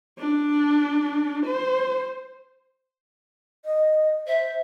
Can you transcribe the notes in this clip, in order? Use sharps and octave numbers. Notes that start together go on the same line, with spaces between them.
D4
C5
D#5
C5 E5